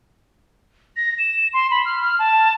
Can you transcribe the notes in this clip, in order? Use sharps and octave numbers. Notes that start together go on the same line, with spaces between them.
A#6
E7
C6
B5
F6
F6
A5